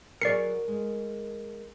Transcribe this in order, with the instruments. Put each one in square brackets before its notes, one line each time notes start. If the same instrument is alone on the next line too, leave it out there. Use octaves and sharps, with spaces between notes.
[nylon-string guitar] F#3 G#4 [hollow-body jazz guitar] A#4 C#5 [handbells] D5 C7 C#7
[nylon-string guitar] G#3